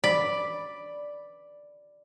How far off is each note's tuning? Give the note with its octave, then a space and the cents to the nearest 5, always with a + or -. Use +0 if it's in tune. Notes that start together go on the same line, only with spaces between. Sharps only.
D5 +0 B5 +0